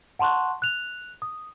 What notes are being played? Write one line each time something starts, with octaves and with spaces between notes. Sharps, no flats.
F#5 A5 C6 C#6 F#6
F#6 F7
D#6